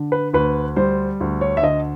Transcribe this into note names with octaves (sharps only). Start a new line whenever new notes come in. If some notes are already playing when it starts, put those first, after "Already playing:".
Already playing: D3
B4
D2 B4
G3 C5
D2
C#5
E5
D3 D#5